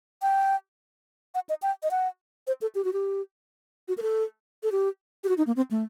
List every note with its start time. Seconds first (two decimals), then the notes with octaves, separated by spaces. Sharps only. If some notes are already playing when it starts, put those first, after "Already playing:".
0.22 G5
1.35 F#5
1.49 D#5
1.62 G5
1.83 D#5
1.91 F#5
2.47 C5
2.62 A4
2.75 G4
2.85 F#4
2.93 G4
3.88 F#4
3.98 A#4
4.02 A4
4.63 A4
4.72 G4
5.24 G4
5.29 F#4
5.38 D#4
5.47 A#3
5.56 C4
5.71 A3